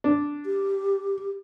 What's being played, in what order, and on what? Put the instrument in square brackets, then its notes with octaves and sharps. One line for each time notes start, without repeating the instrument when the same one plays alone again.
[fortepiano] D4
[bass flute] G4